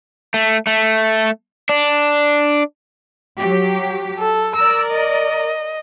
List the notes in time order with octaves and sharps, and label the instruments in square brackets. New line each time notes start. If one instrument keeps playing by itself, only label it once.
[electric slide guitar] A3
A3
D4
[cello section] F#3 G4
[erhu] A4
[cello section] A#4 D5 [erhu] E6
[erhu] D#5